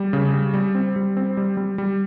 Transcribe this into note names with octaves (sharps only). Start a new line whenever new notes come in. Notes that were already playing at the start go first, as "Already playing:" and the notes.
Already playing: G3
C#3
G3
G3
C4
G3
C4
G3
G3
G3